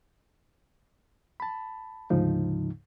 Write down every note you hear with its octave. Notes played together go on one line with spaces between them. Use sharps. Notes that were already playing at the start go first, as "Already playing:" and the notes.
A5 B5
D2 G#2 C#3 F3 D#4